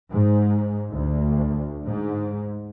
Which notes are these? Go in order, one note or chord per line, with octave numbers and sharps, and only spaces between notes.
G#2
D2
G#2